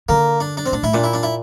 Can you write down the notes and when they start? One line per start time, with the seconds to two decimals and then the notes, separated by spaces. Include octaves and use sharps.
0.09 D3 A#3
0.40 D4
0.57 D4
0.66 C4
0.72 A2 D4
0.83 A2 E4
0.93 A#2 D4
1.04 E4
1.13 D4
1.23 E4